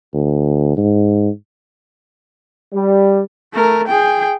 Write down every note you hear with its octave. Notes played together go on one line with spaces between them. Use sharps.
D2
G#2
G3
A3 A#4
G#4 G5